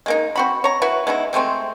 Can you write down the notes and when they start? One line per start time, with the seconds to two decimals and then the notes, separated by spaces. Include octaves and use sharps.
0.06 G#3 A#3 D#4
0.36 C4 F#4 B5
0.64 C#5 A#5
0.82 E4 F#4 B4
1.07 G#3 B3 D#4 E4
1.33 C3 G#3 A3 C4